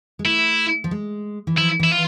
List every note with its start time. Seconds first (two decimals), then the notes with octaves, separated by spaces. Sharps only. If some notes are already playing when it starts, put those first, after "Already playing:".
0.19 G#3
0.25 A3 E4
0.84 F3
0.91 G#3
1.47 E3
1.58 F3 E4
1.80 E3 E4
1.92 F4